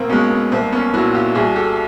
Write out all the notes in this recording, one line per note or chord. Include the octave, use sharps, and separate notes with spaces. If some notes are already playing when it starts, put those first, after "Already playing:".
Already playing: B1 A#3 C4
B2 G#3 B3 C#4
B3
C2 A#3 C4
B3 C#4
A#2 F#3 E4 F#4
F4 G4
C2 F#4 G#4
G4 A4